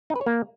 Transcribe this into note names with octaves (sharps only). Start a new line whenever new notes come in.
D#4
B4
C#5
A#3